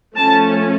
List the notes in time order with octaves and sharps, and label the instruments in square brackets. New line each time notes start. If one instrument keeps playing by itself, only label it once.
[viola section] F3 A3 C#4 A5